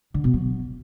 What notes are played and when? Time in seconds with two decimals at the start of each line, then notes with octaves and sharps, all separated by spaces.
0.14 D3
0.24 B2
0.34 F#3